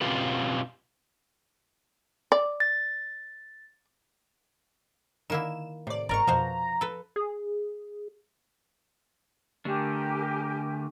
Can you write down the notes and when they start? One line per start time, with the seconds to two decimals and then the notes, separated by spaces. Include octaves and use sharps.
0.01 B2 C4 C#4 F4 G4 B4
2.32 D5
2.60 A6
5.30 D3 D#3 A#3 E4 E7
5.87 A2 C3 D5
6.09 G1 G#2 A#4 D5 A#5 C#6
6.27 F2 B2 F3 F#4 C5
6.81 A4 B4
7.16 G#4
9.65 D3 A3 D4 G4 A#4 G#5